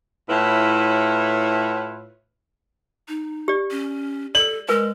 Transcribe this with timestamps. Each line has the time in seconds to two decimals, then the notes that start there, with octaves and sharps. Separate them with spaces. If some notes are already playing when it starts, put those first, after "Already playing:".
0.29 A2 E4 F4 B4 C#5
3.08 D#4
3.48 G4 D5
3.71 C#4
4.35 A4 D5 F#7
4.69 G#3 A#4 B4 G#5